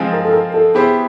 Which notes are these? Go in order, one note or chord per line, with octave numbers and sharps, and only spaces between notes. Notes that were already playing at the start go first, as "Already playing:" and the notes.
Already playing: F3 G#3 C4 F4 G#4
A#4
A4
A#4
A4
B3 E4 G4 G#4 C5